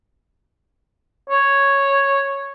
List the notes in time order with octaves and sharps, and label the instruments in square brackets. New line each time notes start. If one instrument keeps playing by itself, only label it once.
[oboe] C#5